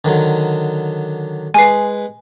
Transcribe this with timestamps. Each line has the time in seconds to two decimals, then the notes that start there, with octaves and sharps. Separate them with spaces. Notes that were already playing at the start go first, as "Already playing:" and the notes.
0.05 D3 D#3 F#3
1.54 G#3 B4 G#5 C7